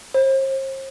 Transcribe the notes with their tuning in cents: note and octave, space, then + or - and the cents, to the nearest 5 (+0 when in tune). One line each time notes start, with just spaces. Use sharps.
C5 +40